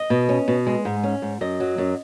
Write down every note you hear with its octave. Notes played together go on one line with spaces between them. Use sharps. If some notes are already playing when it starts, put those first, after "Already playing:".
Already playing: D#5
B2
C#4
B2
G#3
G#2
C#4
G#2
F#2 D#5
F#3
F#2